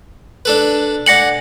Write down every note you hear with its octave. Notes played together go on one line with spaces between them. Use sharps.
D4 A4 B4
D5 F#5 G#5 A#6 C#7 F#7